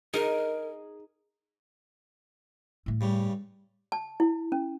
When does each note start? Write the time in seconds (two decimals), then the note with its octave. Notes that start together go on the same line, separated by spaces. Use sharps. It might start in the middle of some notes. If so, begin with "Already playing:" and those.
0.14 D#4 G#4 A#4
2.86 A2 A3
3.01 G2 C#3 G3
3.92 A5
4.20 E4
4.52 C#4